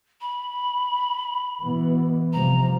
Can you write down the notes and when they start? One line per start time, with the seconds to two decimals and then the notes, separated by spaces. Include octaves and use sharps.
0.21 B5
1.63 B2 E3 B3
2.33 C3 F3 G3 A#5